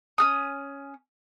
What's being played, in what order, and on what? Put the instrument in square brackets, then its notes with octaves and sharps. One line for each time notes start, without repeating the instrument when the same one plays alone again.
[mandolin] C#4 F#4 D#6